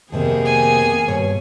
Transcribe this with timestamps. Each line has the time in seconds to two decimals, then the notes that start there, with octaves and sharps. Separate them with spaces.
0.12 F2 C3 D#3 A#3 B3 G#4
0.45 G#5
1.07 G2 B2 C#5